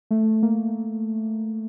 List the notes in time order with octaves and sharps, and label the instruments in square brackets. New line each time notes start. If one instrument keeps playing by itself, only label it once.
[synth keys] A3
A#3